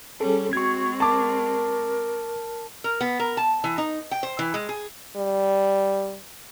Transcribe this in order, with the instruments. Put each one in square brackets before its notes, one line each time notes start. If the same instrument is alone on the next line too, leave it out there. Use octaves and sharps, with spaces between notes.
[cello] G3 C#4 [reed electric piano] G#4 A4
[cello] G#3 C4 [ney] F#4 [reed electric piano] C#6 G#6
[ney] A#4 [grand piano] A5 D6
[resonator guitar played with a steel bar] A#4
B3
A#4
A5
E3
D#4
G5
C5
E3
G#3
G#4
[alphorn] G3